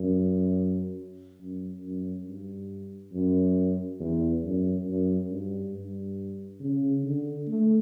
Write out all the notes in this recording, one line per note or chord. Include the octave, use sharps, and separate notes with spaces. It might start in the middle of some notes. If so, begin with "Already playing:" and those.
Already playing: F#2
F#2
F#2
G2
F#2
E2
F#2
F#2
G2
G2
C#3
D3
A3